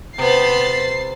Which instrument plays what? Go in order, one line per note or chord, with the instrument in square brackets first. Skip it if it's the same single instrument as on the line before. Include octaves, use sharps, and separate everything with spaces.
[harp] C3 [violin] B3 B5 [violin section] C5 A6 [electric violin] C7